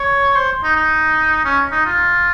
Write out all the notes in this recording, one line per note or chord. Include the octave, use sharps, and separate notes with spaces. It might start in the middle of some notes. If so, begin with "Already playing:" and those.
Already playing: C#5
C5
D#4
D#4
C#4
D#4
F4